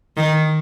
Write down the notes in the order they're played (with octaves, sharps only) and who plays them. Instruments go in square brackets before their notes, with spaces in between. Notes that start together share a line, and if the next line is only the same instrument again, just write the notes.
[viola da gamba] D#3